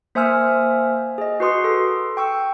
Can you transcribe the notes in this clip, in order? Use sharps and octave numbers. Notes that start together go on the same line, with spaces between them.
A#3 C5 E5 G#5 E6 F6
G#4 D#5
F#4 B4 C6 D#6
A4 C6
G5 C#6 E6